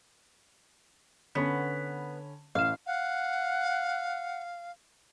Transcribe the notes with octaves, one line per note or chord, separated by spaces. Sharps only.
D3 B3 C#4 B5
A1 F5 E7
F5 F#5